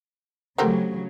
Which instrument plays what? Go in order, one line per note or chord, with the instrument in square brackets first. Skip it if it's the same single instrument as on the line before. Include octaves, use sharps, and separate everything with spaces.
[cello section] C#3 F#3 [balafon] A3 A4 F#5 [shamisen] C4 G4 A#4